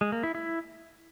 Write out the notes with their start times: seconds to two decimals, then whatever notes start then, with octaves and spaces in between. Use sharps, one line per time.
0.01 G#3
0.12 A#3
0.23 E4
0.35 E4